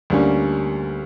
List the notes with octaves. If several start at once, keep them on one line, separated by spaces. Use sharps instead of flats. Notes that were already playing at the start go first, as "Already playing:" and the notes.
D2 D3 G3 A#3 C#4